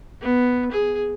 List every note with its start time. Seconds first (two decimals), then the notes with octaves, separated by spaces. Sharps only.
0.21 B3
0.72 G#4